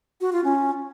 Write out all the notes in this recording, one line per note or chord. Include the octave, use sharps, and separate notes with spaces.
F#4
F4
C#4